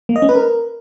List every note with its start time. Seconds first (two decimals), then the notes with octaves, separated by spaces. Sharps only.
0.09 A#3
0.16 D#5
0.22 C#4
0.29 B4
0.35 A#4